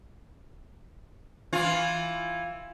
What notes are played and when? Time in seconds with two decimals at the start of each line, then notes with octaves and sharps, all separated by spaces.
1.53 E3 F4